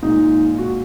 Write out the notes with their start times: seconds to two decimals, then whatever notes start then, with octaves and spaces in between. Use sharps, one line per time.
0.03 A#2 G#3 D#4
0.58 F#4